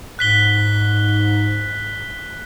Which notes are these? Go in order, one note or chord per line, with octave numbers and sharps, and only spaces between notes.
G#2 F#6 B6 G7